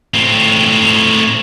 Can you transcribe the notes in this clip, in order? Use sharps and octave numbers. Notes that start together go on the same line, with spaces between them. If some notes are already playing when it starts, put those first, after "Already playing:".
A2 C4